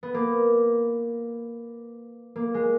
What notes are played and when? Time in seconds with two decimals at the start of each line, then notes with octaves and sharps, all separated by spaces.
0.03 B3
0.14 A#3
2.36 A#3
2.54 G#3